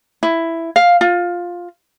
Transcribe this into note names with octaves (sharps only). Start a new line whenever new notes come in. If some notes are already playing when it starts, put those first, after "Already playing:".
E4
F5
F4